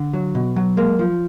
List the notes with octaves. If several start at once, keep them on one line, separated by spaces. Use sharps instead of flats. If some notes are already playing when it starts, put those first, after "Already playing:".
Already playing: D3
F#3
B2
F#3
G#3 A#3
F3